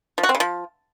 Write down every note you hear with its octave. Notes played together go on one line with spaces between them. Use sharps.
F3
F#4
C4
C#3
F3